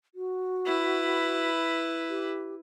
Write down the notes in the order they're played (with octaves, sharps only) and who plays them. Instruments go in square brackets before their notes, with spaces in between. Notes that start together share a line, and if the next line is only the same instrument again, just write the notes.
[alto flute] F#4
[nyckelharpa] E4 B4
[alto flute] G4